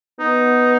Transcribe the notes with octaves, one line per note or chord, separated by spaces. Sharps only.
B3 D#4